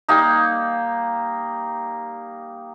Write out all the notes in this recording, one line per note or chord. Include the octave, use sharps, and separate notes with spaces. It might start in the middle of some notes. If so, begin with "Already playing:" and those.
G3 A#3 D#4